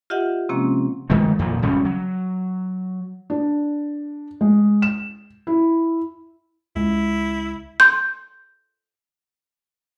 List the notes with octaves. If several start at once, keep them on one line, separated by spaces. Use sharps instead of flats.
F4 G4 D#5 E5 F#5
C3 F3 G#3 A#3 C4 C#4
G1 D#3 G#3 A3
F2 A#2 D#3 F3
G#1 C#3 G3 C#4
F#3
D4
G#3
E7
E4
C#2 G#3 E4
C6 G6